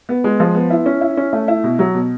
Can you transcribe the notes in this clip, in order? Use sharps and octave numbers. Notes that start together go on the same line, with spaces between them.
B3
G#3
F3
B3
E4
C#4
E4
C#4
A3
E4
B2
F#3
B2